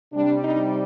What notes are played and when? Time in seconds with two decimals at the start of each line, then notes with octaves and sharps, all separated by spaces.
0.12 C3 G3 D4
0.42 D#4